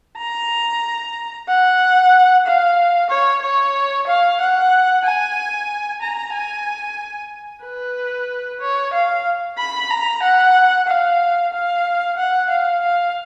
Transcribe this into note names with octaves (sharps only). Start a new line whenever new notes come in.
A#5
F#5
F5
C#5
C#5
F5
F#5
G#5
A#5
G#5
B4
C#5
F5
B5
A#5
F#5
F5
F5
F#5
F5
F5